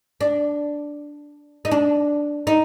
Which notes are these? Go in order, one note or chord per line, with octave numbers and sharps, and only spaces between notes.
D4
D#4
D4
D#4